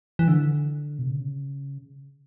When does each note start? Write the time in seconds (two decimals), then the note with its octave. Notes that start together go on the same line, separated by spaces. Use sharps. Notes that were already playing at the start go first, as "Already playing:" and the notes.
0.19 E3
0.28 D3
0.99 B2
1.07 C#3